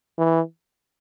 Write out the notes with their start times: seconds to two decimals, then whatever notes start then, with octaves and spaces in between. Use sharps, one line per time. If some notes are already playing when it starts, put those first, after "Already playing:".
0.18 E3